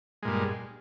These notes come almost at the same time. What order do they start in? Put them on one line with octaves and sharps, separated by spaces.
G#3 A#2 G2